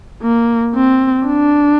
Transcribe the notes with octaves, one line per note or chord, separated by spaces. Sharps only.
A#3
C4
D4